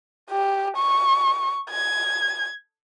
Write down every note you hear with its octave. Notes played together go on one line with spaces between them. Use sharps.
G4
C#6
G#6